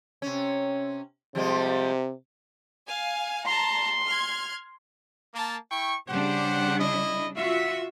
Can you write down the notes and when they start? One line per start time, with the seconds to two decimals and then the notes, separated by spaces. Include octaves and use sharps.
0.22 C3 C#4
1.35 C3 F3 G3 G#3
2.87 F5 G#5
3.46 A5 A#5 C6
4.06 F6 G#6
5.34 A#3 A5
5.70 E4 G5 C#6
6.08 C#3 G3 D4 G4 C5 F#5
6.79 E4 D#5
7.37 F4 F#4 E5